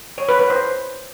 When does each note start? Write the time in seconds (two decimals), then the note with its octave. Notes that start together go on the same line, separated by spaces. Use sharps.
0.18 C#5
0.29 B4
0.39 B4
0.50 C5